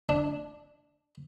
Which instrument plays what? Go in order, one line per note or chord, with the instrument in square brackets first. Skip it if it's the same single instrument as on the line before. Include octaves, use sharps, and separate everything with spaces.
[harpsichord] D4